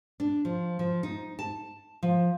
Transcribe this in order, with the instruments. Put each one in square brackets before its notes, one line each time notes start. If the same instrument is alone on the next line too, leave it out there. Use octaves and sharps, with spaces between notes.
[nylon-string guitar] D4
F3
F3
D#4
A5
F3